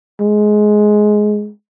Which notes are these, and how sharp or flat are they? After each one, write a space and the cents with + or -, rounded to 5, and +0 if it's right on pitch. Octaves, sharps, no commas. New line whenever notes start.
G#3 +15